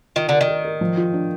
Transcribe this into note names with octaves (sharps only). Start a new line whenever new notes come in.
D#3 F4
D3 A#4
D#3
A#4
A#4
F3
F4
D4